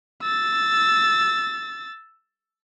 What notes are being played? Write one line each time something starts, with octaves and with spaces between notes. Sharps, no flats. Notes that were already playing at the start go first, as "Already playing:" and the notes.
E6 A6